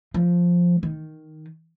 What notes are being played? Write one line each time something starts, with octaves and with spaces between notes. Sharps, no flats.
F3
D#3